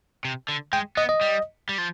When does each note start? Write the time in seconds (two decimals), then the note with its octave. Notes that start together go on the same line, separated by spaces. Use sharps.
0.25 C3
0.49 D3
0.73 G#3 G5
0.97 B3 D#5
1.09 D#5
1.21 G3
1.69 G3
1.78 F3